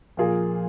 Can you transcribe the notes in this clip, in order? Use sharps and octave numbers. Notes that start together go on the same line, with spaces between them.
A#2 F3 A#3 F4 G#4